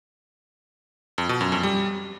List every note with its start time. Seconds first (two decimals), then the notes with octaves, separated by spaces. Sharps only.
1.18 F2
1.29 B2
1.41 F#2
1.52 F2
1.63 G3